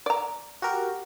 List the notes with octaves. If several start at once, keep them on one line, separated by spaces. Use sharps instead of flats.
D5 A#5
F#4 G4 A#4